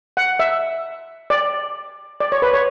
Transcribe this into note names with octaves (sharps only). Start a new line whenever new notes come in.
F#5
E5
D5
D5
C#5
B4
C#5